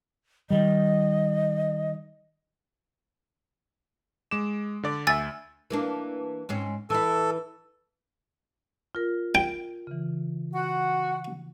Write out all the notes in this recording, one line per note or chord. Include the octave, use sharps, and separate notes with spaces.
D#3 G3 D#5
G#3 D6 E7
D3 D5 D6
D2 E5 G#5 E6 A6
E3 A#3 D4
G#2 C4 C#4
E3 E4 A4
F4 A#4
G5
C#3 E3
F#4 F#5